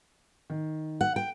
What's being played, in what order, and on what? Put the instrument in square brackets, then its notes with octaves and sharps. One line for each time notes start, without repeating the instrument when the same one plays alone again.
[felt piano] D#3
[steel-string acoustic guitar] F#5
G5